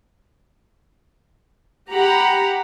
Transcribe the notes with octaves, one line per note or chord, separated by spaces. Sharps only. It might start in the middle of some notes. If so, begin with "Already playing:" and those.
G4 F#5 A#5 B5